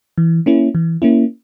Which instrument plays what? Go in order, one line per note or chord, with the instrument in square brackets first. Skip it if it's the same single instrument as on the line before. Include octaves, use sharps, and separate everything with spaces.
[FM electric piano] E3
A#3 C#4 E4
E3
A#3 C#4 E4